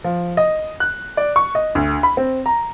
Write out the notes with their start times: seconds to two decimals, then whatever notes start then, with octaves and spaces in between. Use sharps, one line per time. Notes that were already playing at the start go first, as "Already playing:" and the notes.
0.04 F3
0.37 D#5
0.80 F#6
1.17 D5
1.36 C#6
1.55 D#5
1.75 D2
2.03 B5
2.17 C4
2.46 A#5